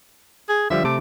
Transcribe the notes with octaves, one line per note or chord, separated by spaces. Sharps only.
G#4
D3 F3 G3 E5
C3 A3 A4 D6